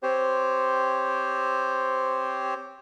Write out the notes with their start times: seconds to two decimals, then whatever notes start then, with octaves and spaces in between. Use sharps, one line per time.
0.03 C4 G4 C5 C#5